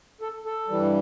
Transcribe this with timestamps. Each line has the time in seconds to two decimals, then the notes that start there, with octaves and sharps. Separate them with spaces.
0.21 A4
0.46 A4
0.68 G2 E3 G3